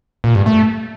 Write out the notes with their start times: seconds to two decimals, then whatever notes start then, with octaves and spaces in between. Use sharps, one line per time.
0.24 A#2
0.35 G2
0.46 A3